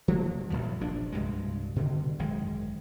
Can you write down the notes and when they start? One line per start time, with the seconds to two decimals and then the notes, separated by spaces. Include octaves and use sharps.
0.08 F3 G3 A#3
0.50 A1 A#2 C#3 F3
0.81 F1 A#1 F3 D4
1.12 C2 G2 B2 G#3
1.76 B2 D3 D#3
2.19 G#1 F#2 D#3 G#3